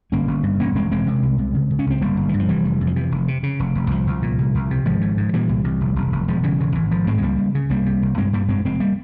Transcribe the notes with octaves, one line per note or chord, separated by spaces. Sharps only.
G1 A#3 C#4
G1
G2
E1 A#3 C#4
E1 G#3 C4
E1 G#3 C4
C3
C2
C3
C#3
C#3
C#4
C#2 C4
G1 G3 A#3
G1
G2 E3
F3
F1 E3 G3
F1
F2
F3
C3 E3
F1
C3
C#3
F1
F1
C2 F3
C2
A#2
C2
C2
C3
G#1 F3 G#3
G#2
G#2
A#2 E3 G3
C2
C2
F1
F1
F1
E1 F3 G#3
C#3 E3 G3
E1 E3
G#1 E3
G#1 F3
G#2 G#3 C4
G#3
C#2 G3 A#3
C#2
C#3
C2 G3 A#3
C3
C2
G2 G#3 C4
G2 G3 A#3
G2 G#3 C4
F1 G#3 C4
G3 A#3